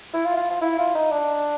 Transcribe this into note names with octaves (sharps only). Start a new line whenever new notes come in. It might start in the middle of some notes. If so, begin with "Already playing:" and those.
E4
F4
F4
F4
E4
F4
D#4
D4